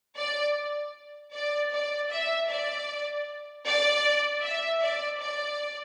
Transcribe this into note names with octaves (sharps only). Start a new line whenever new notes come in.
D5
D5
D5
E5
D5
D5
E5
D5
D5